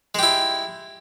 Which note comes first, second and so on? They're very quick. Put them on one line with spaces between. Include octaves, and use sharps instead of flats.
G#3 G4 E4